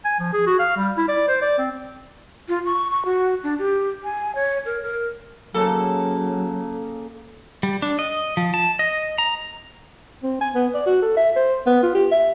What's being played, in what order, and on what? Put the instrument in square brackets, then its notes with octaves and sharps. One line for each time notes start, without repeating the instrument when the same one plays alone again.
[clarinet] G#5
F3
G#4
F#4
F5
G3
E4
D5
C5
D5
C4
[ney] F4
C#6
C#6
F#4
D4
G4
G#5
C#5
A#4
A#4
[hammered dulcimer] C#3 A#3 [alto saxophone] F#3 [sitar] A4
[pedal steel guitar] G3
D4
D#5
F3
A5
D#5
A#5
[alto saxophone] C4
G#5
B3
D5
F#4
A4
E5
C5
B3
F4
G4
E5